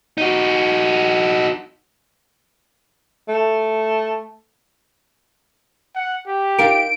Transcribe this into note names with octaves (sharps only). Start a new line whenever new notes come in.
D#4 F#4
A3
F#5
G4
D#4 F4 A#4 D7